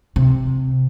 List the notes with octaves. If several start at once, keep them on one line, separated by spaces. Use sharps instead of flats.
C3